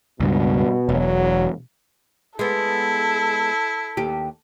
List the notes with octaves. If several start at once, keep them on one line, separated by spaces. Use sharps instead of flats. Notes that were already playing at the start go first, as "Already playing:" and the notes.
C#2 G2 B2
E1 F#3
G#3 B3 E4 A4
D#2 G4